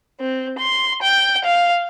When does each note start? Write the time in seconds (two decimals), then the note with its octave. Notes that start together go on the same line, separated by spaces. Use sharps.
0.20 C4
0.57 C6
1.02 G5
1.44 F5